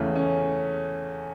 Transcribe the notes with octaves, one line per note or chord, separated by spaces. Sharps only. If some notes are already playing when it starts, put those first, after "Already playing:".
Already playing: E2 C#3 A3 C#4 E4
C#4